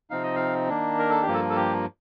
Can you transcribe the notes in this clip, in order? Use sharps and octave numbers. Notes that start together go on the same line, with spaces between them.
C3 F3 C4 D#4 F5
D#5
F5
D#3 A#3 D4
A#4
A4
G4
G2 F3 A#3
A4
A4
G4